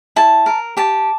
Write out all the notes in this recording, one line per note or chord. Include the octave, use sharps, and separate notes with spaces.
E4 A5
A#4
G4 A5